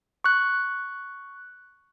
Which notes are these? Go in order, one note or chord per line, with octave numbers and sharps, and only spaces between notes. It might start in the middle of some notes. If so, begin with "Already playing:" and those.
C#6 F#6